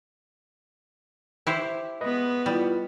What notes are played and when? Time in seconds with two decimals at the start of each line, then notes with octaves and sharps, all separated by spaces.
1.47 E4 G4 C5
2.01 G#3 B3 B4 D#5
2.46 G3 E4 F4